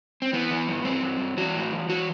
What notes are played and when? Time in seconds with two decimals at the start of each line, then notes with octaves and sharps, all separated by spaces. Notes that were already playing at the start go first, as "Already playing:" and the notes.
0.22 C4
0.33 E3 B3
0.51 E3
0.67 G2
0.85 G2 C4
1.03 G2
1.20 G2
1.37 E3 F#4
1.55 A2
1.72 E3
1.89 E3 F#4